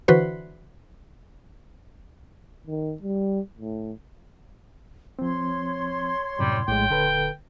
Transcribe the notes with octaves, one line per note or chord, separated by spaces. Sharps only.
D3 E3 F#4 B4 C5
D#3
G3
A2
F3 C4 C#5 C6
F#2 A2 C3 G3
A#1 A2 G#3 G5
D#1 D3 A4 B4